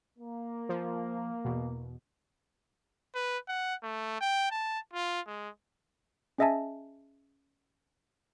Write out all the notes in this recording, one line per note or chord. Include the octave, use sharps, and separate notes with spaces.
A#3
F3
E2 B2
B4
F#5
A3
G5
A5
F4
G#3
C#4 G#4 D#5 E5 G#5 A5